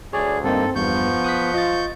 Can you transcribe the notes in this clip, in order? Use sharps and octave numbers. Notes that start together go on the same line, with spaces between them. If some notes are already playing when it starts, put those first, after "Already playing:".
D2 G#4 C#5 D5
G2 A#3 C4 D#4 A4
E2 G2 F3 B3 C#6 G6
D#6 F#6 B6
F4 D#5 A6